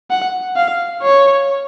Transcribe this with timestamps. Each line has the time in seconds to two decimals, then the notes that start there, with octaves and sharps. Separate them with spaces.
0.10 F#5
0.56 F5
1.03 C#5